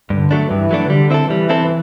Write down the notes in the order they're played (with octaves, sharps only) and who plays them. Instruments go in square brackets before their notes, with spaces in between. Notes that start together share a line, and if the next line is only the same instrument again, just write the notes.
[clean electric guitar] G2 [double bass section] D3
[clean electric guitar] F#3 A3 D4
[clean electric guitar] G2 [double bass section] E3
[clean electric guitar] F#3 A3 D4
[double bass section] D3 [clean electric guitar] G3
[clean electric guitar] C4 E4 A4
[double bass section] E3 [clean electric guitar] G3
[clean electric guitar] C4 E4 A4